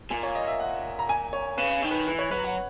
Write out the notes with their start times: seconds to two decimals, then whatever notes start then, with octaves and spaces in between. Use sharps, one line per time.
0.10 A#2 G#5
0.23 C#5
0.35 D#5
0.47 E5
0.60 F#5
0.99 A#5
1.09 G#5
1.33 C#5
1.57 C#3 B4
1.82 D#3
1.91 B4
2.07 E3 B4
2.19 C#5
2.31 F#3 B4
2.44 F#5